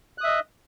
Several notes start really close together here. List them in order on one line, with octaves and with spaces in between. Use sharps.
F#6 D#6 E5 D#5